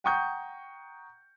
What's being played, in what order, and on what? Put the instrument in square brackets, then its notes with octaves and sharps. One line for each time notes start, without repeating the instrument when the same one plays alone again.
[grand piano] F#5 G5 A#5 C#6 D#6 G6